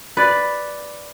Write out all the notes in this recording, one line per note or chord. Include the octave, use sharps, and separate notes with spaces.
B4 D5